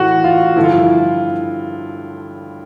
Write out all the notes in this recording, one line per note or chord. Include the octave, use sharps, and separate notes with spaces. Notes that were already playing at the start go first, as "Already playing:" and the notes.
Already playing: A2 E3 F#4
F4
G2 D3 F3 E4
F4
E4